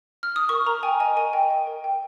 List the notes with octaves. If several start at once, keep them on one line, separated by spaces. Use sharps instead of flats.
F6
D#6
A#4 C#6
A#4 A#5
G5 G#5
D#5 G#5
A#4 G#5
D#5 G5
G5
A#4
G5